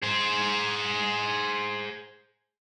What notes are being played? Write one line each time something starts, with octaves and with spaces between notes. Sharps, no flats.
G#4 C5